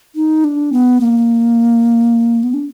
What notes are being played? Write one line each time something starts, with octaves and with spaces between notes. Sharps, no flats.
D#4
D4
B3
A#3
B3
D4